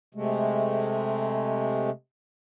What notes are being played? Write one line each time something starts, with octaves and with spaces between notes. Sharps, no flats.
C3 G#3 A3